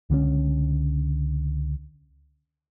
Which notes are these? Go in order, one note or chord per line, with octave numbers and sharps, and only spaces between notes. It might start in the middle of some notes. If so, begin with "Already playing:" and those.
C#2 D3 F#3 C#4